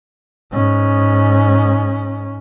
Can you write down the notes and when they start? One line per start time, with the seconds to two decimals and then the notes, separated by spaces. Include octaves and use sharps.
0.51 G#2 C#4